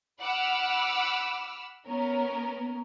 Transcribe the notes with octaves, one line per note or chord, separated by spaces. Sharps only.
F#5 B5 D6 E6 F6
B3 C#4 A#4